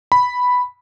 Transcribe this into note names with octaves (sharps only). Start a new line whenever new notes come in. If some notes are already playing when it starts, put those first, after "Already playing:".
B5